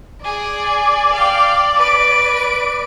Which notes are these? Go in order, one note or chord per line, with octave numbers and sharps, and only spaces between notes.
G#4 D5
F5 G5
B4 D7